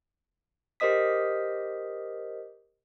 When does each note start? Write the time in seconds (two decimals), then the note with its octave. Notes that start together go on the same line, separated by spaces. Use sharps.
0.80 G4 A#4 C5 D#5 D#6 B6